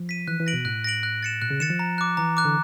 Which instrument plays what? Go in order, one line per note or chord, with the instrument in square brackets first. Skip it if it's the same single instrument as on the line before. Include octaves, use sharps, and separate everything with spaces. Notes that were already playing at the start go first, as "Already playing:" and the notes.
Already playing: [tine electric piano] F3
[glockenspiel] B6 D#7
[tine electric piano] E3 [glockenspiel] F#6
[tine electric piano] E3
[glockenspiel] A#6 D7 F#7
[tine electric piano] B2
[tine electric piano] A2 [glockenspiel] F#6
[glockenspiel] A#6 D7 F#7
F#6
A6 C#7 E7
[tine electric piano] A#2 [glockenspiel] F#6
[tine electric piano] C#3
[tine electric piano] D#3 [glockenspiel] A6 C#7 E7
[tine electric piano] F3
[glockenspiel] A#5
D6 F#6
[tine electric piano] E3 [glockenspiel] A#5
[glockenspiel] D6 F#6
[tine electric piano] D3